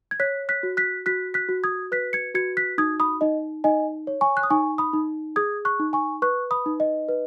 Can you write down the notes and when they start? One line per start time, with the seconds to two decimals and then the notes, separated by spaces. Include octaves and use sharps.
0.11 G#6
0.20 C#5 F#6 B6
0.49 F#6 B6
0.63 F#4
0.77 F#6 B6
1.06 F#4 F#6 B6
1.34 F#6 B6
1.49 F#4
1.64 D#6 G#6
1.92 B4 F#6 B6
2.13 G#6 C#7
2.35 F#4 G#6 C#7
2.57 F#6 B6
2.78 D#4 D#6 G#6
3.00 B5 D#6
3.21 D#4 D#5
3.64 D#4 D#5 G#5
4.07 C#5
4.21 G#5 C#6
4.37 F#6
4.43 D#6
4.50 D#4 G#5 C#6
4.78 B5 D#6
4.93 D#4
5.36 G#4 D#6 G#6
5.65 C#6 F#6
5.80 D#4
5.93 G#5 C#6
6.22 B4 C#6 F#6
6.51 B5 D#6
6.66 D#4
6.80 D#5
7.09 B4